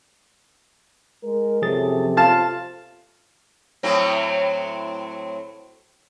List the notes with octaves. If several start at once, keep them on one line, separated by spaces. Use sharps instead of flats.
G#3 A#4
F#2 C3 F3 G#4 A4 A6
F4 C5 F5 A5
A2 F#3 C4